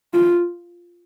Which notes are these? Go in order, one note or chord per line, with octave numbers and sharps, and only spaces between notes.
F4